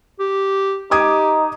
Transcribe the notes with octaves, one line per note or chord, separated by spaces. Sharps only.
G4
D#4 G4 D6 D#6 G#6